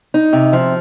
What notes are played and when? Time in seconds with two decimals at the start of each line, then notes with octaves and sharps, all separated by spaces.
0.14 D#4
0.33 C3
0.53 F3